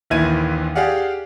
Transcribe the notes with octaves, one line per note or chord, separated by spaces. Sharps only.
A#1 D#2 E3 E4 G#6 D#7
G4 G#4 D5 F5 F#5